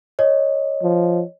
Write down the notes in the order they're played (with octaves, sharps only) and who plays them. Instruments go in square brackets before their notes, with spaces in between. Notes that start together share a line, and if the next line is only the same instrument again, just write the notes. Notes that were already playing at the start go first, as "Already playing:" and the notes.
[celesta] C#5 D#5
[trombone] F3